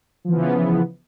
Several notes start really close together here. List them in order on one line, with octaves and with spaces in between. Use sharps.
F3 E3 B3 C#3